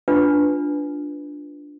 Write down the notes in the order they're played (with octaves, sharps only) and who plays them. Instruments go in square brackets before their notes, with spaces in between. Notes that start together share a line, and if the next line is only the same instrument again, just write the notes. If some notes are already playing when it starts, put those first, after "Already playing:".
[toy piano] D4 F4 B4